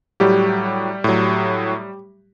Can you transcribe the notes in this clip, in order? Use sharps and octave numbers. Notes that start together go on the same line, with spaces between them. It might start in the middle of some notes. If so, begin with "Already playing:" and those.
A2 F#3 G3 G4
A2 F#3